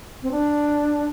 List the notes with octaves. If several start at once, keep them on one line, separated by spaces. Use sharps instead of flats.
C4
D4